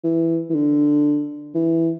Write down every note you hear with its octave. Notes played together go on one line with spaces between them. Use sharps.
E3
E3
D3
E3